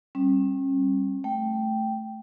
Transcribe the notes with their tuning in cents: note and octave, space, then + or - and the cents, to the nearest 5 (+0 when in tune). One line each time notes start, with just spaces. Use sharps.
G3 +0 C#4 -40
A3 +0 G5 -5